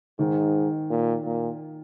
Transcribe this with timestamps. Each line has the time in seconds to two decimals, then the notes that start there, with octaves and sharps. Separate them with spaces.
0.19 G#2 D#3
0.91 A#2
1.25 A#2